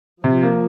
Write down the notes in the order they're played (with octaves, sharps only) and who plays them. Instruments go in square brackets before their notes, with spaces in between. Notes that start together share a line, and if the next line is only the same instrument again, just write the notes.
[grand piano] C3 [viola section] F3
[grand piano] A#3